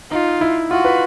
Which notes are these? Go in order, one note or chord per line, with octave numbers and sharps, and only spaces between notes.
D#4 F4
E4
F4 F#4
B4